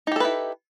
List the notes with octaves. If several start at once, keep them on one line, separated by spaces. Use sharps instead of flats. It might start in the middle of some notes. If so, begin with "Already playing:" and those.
D#4 E4 G4 A4 B4